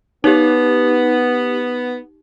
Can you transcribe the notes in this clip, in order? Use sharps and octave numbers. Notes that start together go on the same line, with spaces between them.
B3 D#4 G4